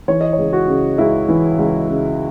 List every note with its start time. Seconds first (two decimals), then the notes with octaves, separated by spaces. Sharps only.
0.08 E3 C#5
0.21 D#5
0.33 C#5
0.38 C#2
0.53 F#4
0.68 C#3
0.98 C#2 E4
1.28 E3
1.58 C#2
1.88 C#3